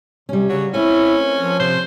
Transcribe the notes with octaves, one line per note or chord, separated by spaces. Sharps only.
C3 G3 C#4
C#3 F#3
A3 C4 C#4 E4
F3
C3 C5